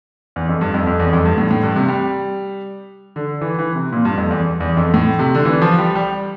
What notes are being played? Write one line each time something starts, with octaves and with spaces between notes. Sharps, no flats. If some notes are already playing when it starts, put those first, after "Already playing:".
E2
F2
G2
F2
F2
E2
F2
G2
A2
A2
G2
C3
G3
D3
E3
E3
C3
A#2
G2
F2
E2
E2
F2
A2
C3
D3
E3
F3
G3
G3